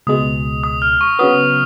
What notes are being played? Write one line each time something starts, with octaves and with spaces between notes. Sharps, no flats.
C#2 B2 G#3 D#6
D#6
F6
C#6
C#3 F#3 B3 D#6